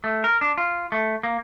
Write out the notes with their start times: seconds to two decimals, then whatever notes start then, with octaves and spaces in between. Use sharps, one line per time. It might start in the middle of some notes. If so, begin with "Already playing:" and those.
0.04 A3
0.24 A#4
0.41 D4
0.58 F4
0.92 A3
1.23 A#3